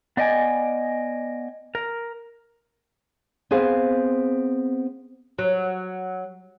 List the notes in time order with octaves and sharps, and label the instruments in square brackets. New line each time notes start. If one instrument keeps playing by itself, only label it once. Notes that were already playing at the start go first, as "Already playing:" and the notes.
[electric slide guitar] B3 D5 D#5 G5 G#5
A#4
[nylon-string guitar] B3 C4 G#4 C5 F5
[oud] F#3